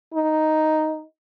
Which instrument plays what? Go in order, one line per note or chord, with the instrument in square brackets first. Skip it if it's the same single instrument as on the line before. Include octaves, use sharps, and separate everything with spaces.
[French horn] D#4